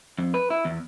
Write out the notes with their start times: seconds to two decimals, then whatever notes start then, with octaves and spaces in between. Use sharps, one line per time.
0.18 F2
0.34 B4
0.50 E4
0.65 E2